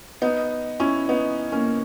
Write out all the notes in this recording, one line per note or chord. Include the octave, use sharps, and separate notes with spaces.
B3 D#4
C#4 E4
B3 D#4
A#3 C#4